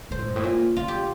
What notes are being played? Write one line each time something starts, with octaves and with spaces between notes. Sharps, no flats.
A#2 C5
A2
G2
A2
A#2
C3 F4
G4